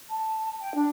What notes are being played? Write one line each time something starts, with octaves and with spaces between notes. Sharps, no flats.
A5
G5
D4